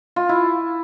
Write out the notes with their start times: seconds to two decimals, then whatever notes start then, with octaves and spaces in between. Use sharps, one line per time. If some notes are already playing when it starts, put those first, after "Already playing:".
0.16 F4
0.29 E4